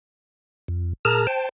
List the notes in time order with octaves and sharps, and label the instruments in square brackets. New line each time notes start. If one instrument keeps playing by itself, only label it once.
[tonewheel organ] F2
A#2 G#4 A#4 A5 A#5 F6
C5 G5 A5